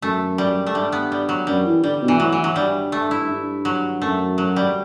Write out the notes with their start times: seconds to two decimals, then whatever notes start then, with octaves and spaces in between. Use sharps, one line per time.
0.02 F#2 A3
0.38 G3
0.67 A3
0.75 G2 G3
0.92 B3
1.12 G3
1.29 F#3
1.47 F#2 G3
1.66 E3
1.84 D3 G3
2.02 B2
2.08 E3
2.19 A2 F#3
2.32 E3
2.44 F#3
2.56 G2 G3
2.92 A3
3.11 E4
3.29 G2
3.65 F#3
4.02 F#2 A3
4.38 F#3
4.56 G3